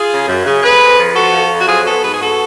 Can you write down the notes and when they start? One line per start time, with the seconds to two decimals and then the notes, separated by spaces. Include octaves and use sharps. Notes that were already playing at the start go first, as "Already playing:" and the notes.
Already playing: F4 G#4
0.11 C#3
0.27 F#2
0.45 C#3
0.63 F2 G#4 B4
0.81 F2
0.98 F3
1.15 F2 F#4 A4
1.33 F3
1.50 F2
1.57 F#4
1.67 F#3 F4 G#4
1.85 B3 F#4 A4
2.03 G#2 G#4 B4
2.13 G#4
2.20 B3 F#4 A4